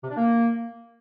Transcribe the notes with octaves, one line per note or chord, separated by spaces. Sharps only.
C3
D4
A#3